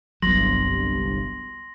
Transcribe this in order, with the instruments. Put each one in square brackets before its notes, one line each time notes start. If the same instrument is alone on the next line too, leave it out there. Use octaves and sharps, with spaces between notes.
[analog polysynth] G1 C2 G2 [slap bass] F#3 B3 [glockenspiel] C6 A#6 F#7